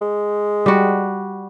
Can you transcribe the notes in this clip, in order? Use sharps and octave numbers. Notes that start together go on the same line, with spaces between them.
G#3
G3 F#4